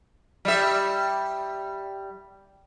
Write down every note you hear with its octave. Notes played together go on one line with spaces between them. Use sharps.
G3 E5